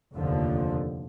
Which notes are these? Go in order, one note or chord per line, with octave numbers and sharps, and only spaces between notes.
F1 D#2 D3 F3